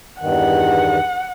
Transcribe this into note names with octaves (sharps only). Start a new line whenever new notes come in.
E2 G2 D#3 F#5